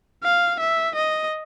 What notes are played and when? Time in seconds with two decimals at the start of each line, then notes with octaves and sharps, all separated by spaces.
0.24 F5
0.60 E5
0.95 D#5